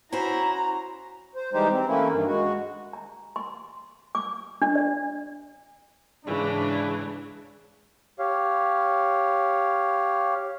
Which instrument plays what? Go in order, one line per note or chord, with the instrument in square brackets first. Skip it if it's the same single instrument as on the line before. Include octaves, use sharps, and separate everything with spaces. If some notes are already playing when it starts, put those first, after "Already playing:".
[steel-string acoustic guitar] C#4 F#4 C5 [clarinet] E4 [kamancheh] A#5
[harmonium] C5
E3 G3 G#3 D#4 G4 C5
C4
E3 A3 A#3 C#4 E4
G2 D#3
G#3 F#4
[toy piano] A#5
C6
D6
D4
D5
[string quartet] G#2 C#3 E3 [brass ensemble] D4
[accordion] G4 C#5 F5